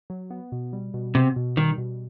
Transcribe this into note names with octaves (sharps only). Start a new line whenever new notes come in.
F#3
B3
B2
G3
B2
C3 B3
B2
D#3 G3
B2